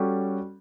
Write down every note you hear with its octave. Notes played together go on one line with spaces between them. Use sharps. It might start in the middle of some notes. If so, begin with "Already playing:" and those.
Already playing: G3 C#4 F#4 A4